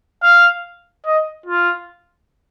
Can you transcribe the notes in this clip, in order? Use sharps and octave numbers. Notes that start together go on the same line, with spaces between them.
F5
D#5
F4